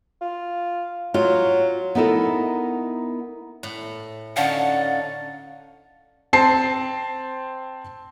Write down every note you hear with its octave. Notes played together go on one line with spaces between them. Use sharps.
F4
F#3 F4
B3 D#4 E4 A4 A#4
A2
D3 C#4 D#4 F5 F#5 A5 A6
C4 A5 C7